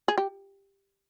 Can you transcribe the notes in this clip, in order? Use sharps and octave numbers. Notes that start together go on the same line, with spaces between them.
G#4
G4